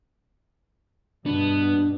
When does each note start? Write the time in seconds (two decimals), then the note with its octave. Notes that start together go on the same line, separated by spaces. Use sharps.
1.26 G2 B2 B3 D4